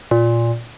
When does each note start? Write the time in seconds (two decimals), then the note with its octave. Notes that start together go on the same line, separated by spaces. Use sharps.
0.11 A#2